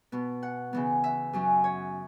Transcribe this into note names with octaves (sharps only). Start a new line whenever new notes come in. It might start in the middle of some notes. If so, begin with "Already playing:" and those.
B2 B3
F#5
C#3 E3 B3
E5
F#2 F#3 C#4
C#5